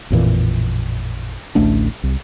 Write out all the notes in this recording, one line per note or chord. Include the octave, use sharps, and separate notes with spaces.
A1 F2 A#2 E3
A1 D2 A3 D4
C2